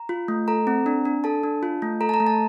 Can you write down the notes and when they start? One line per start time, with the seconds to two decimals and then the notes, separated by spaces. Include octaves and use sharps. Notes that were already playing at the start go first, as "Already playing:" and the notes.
Already playing: A#5
0.09 F4
0.28 A3
0.48 A4 A#5
0.67 C4
0.86 D4
1.05 D4
1.24 A4 A5
1.43 D4
1.63 F4
1.82 A3
2.01 A4 A#5
2.09 A5
2.14 A#5
2.20 A3
2.27 A5